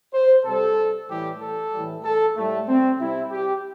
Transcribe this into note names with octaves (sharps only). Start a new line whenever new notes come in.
C5
C3 G3 A4
A2 E3 G3 G4
A4
A2 E3 G3
A4
A2 G3 A3
C4
C3 G3 E4
G4